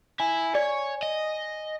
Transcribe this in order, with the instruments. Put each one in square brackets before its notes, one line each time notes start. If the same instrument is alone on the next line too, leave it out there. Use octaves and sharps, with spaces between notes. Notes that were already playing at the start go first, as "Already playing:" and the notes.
[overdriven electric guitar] E4 [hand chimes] G#5
[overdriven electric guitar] C#5 [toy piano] D5
[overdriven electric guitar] D#5